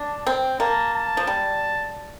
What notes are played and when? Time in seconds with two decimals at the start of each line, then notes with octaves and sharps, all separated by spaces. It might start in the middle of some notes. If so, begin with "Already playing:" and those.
Already playing: D4 A5
0.26 C4 G5
0.60 A#3 A5
0.94 A5
1.17 F3
1.27 G3